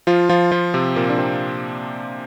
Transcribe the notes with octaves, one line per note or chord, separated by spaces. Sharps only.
F3 F4
F3 F4
F3 F4
C3 C4
A#2 A#3
D4
C3 C4